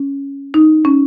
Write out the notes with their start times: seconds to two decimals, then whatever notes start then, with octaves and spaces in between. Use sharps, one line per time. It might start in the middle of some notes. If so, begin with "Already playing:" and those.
Already playing: C#4
0.54 D#4
0.85 C#4